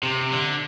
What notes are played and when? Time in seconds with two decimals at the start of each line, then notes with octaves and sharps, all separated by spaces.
0.03 C3
0.31 D3